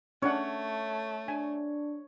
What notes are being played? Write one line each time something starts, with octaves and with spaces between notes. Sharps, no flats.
A3 C#4 D4 C#5 F#5
D4 G#5